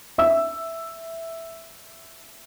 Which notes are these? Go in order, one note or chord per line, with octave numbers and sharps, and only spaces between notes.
E5 E6